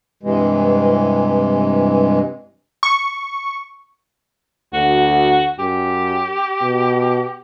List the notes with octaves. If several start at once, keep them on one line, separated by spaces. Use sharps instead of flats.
G2 C3 E3 G#3
C#6
D2 F#4
F#2 G4
B2